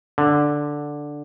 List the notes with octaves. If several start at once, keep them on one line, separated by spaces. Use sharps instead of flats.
D3